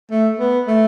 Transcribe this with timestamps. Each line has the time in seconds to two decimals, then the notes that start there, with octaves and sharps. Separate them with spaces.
0.10 A3
0.39 B3
0.68 A3